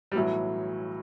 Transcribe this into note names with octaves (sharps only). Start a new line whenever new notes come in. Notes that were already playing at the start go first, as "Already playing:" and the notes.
G3
B1 A2 E3 F#3